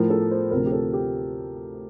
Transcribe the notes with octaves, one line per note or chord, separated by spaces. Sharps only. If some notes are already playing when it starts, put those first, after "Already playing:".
Already playing: A2 F3 A#4
A4
C5
D2 C3 F3 A#4
G4
A4
G4